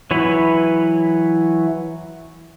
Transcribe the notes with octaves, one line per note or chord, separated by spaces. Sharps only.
E3 F#3 E4 B4 C#5